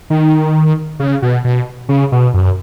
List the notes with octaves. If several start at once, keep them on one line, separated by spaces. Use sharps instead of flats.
D#3
C#3
B2
B2
C#3
B2
F#2